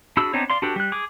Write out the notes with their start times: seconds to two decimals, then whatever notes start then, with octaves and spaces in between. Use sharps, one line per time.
0.17 D4 F#4 G#4 B5 E6
0.33 B3 C4 D4 D#4 C#5
0.50 D5 F5 C6
0.62 D4 F#4 G4 A4 B4
0.76 G3 F#6
0.92 G#4 D6